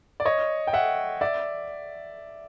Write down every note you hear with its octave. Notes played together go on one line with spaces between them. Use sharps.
D5
C#5 D#5
G5
E5 F#5
D5 E5